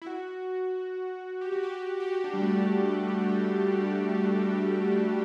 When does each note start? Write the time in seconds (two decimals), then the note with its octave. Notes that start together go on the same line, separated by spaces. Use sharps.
0.02 E4
0.07 F#4
1.41 G4
1.52 F#4
1.63 G4
2.00 G4
2.08 F#4
2.24 D4
2.34 G3
2.42 A3